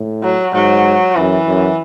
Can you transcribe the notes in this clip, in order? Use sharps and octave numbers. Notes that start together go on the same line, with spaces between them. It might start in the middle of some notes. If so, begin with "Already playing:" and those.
Already playing: A2
F#3
G#2 F#3
F#2 E3
F#2